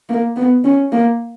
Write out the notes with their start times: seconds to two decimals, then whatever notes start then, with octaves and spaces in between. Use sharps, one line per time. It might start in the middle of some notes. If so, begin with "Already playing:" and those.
0.09 A#3
0.37 B3
0.65 C#4
0.92 A#3